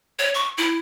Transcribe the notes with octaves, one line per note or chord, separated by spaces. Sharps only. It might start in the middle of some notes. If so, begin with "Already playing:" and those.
C#5
C#6
E4